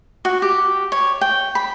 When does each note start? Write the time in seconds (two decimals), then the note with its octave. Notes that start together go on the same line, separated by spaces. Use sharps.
0.25 F#4
0.42 G4
0.92 C#5
1.21 G5
1.55 B5